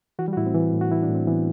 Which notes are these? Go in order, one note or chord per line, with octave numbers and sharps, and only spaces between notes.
E3 F#4
G3
F#4
A2 E4
C4
E3
A2
F#4
E3 E4
D4
A2
C4
E3 B3